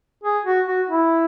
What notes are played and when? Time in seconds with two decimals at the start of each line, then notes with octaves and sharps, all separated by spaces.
0.24 G#4
0.45 F#4
0.67 F#4
0.89 E4